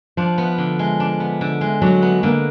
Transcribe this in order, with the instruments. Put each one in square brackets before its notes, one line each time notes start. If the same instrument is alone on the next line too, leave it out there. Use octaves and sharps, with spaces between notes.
[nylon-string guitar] F3 [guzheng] D4
[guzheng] B3
D3
G#3
D4
B3
D3
G#3
[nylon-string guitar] F#3 [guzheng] D4
[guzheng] B3
[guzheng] D3 [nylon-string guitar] A#3